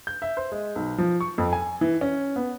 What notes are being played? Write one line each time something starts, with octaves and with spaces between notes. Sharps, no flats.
G6
E5
C5
G#3
B1
F3
C#6
F2
G#5
E3
C#4
B3